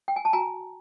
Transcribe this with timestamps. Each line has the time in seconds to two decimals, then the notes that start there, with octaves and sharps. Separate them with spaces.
0.08 G5
0.16 G#5
0.25 A5
0.33 F#4 G#5 A#5